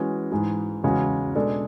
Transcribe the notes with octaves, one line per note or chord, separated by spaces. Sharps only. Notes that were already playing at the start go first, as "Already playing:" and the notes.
Already playing: E3 G#3 C#4 F#4 B4
G#2 E3 G#3
E2 C#3 G#3 C#4 F#4
B2 G#3 D4 A4 D5